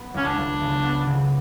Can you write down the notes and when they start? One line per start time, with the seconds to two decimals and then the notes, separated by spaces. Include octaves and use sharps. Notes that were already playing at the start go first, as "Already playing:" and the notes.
Already playing: B3
0.14 C#2 C#4
0.25 D4
0.37 C#2
0.61 C#3
0.83 B3
1.07 C#3